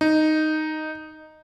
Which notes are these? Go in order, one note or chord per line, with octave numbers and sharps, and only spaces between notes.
D#4